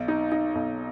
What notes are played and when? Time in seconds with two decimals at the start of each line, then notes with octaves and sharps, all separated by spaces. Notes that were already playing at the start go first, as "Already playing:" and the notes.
Already playing: B1
0.08 D#4
0.32 D#4
0.55 B1